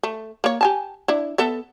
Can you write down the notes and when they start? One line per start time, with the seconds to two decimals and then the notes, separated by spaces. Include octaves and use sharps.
0.03 A3
0.44 A#3 C#5
0.61 G4 G#5 A5
1.08 D4 E4
1.38 B3 A4 E5